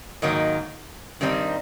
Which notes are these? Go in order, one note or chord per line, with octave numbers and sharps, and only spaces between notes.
G#2 D#3 F#3 A#3
G2 D#3 G3 C4 D#4